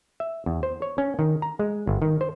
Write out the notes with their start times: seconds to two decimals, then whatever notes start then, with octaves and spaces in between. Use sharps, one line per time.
0.20 E5
0.46 E2
0.63 C5
0.82 C#5
0.98 C#4
1.19 D#3
1.42 A#5
1.60 G#3
1.87 G1
2.02 D#3
2.21 C5